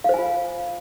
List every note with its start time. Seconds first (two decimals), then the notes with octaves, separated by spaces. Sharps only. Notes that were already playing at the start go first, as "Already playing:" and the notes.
0.04 F5
0.09 C5
0.14 G#5
0.19 F4